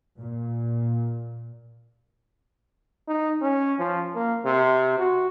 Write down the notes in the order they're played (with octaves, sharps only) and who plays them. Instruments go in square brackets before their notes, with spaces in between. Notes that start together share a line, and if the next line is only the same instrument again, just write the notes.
[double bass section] A#2
[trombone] D#4
C#4
F3
A#3
C3
F#4